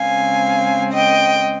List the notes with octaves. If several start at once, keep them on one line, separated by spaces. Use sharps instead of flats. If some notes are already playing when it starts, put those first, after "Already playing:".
Already playing: C#3 G#3 C4 F5 G#5
D#5 G5